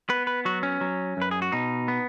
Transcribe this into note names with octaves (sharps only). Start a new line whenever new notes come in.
B3 B4
B4
F#3 F#4
C#4
F#3
F#2 B4
G#4
F#4
B2 D#4
B3